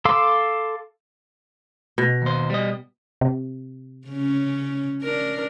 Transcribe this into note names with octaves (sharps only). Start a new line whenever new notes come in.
A4 F5 C6 D6 E6
B2
D#2 C5
G3 D#5
C3
C#3 C#4
C#4 D4 A#4